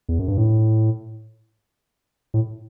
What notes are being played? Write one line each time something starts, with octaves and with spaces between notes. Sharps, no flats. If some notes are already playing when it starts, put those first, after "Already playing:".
E2
F#2
G2
A2
A2